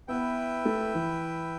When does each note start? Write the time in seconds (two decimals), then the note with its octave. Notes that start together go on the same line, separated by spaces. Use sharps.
0.08 B3 E4 B4 E5 G5
0.65 A3
0.94 E3